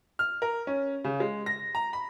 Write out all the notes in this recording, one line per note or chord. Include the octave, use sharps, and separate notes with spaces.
F6
A#4
C#4
C#3
G#3
A#6
A#5
B5